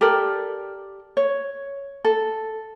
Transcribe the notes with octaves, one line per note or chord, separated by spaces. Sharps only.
G4 A4 A#4 D5
C#5
A4